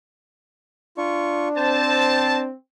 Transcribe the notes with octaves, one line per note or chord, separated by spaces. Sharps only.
D4 F4 C#6
C4 C5 A5